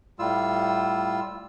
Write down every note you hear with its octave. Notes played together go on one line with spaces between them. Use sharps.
A2 G3 F4 E6